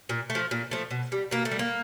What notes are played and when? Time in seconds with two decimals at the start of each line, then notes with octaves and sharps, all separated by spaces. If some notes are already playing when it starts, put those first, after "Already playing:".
0.09 A#2
0.30 A3
0.35 F3
0.51 A#2
0.71 F3 A3
0.91 B2
1.12 G3
1.31 B2 A#3
1.45 A3
1.51 G3
1.59 A#3